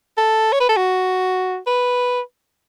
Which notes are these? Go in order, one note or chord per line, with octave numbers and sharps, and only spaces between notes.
A4
C#5
B4
A4
F#4
B4